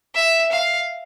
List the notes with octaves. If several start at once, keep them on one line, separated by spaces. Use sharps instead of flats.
E5
F5